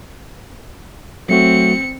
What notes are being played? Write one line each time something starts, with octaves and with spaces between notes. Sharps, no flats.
F#3 A3 C4 F#4 C#7